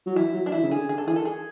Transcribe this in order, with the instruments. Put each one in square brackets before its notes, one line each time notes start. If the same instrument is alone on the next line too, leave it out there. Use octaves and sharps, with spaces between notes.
[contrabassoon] F#3
[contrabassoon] E3 [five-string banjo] E4
[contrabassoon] F#3
[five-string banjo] D4
[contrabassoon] E3 [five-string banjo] E4
[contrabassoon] C#3
[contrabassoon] D3 [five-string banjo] G#4
[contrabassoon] D3 [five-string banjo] G#4
[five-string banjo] A4
[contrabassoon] E3 [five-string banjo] G#4
[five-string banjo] A4
G#4